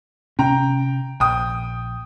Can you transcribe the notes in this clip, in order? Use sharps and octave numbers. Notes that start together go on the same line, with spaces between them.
C3 C#4 G5 A#5
A#1 G5 D#6